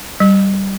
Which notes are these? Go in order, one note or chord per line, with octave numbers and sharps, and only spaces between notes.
G3